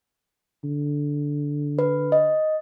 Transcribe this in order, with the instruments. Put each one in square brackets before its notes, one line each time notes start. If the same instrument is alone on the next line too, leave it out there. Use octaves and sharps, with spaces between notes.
[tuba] D3
[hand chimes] B4
D#5